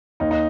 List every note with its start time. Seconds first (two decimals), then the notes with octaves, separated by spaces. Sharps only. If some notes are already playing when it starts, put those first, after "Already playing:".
0.20 D#2 D#4
0.31 D#4